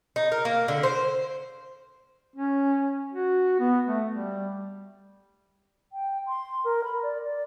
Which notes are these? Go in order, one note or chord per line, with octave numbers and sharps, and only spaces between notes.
D#4
A#4
A#3
D3
C5
C#4
F#4
B3
A3
G3
G5
C6
A#4
B5
D5
D5